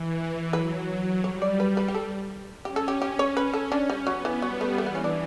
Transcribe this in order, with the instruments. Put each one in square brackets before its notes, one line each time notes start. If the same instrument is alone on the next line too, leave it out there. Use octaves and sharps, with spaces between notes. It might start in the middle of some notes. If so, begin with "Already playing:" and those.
Already playing: [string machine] E3
[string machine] F#3 [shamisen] B4
[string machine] G3 [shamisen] C#5
[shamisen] D5
B4
B4
G4
A4
[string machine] C#4 [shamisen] G4
[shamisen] A4
G4
[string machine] C#4 [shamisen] G4
[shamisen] C#5
B4
A4
D4
G3
[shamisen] F#3 [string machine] B3
[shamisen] E3
[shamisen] F#3 [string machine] G3
[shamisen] A3
[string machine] E3 [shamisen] A3
[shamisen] B3
C#4
D4